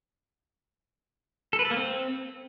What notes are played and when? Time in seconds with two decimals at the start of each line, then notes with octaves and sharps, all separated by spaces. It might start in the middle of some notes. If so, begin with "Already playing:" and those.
1.53 A4
1.59 B4
1.65 A4
1.71 A#3
1.77 C4